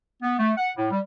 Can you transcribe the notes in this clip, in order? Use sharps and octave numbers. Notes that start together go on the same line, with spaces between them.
B3
A3
F#5
A2
G3